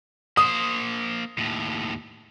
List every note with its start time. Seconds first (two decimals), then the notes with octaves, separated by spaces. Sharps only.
0.37 A#3 C5 D#6
1.38 D#2 A2